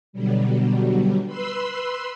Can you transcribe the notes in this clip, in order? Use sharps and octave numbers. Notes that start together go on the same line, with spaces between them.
B2 D3 F#3 G3
B4 B5 C6 E6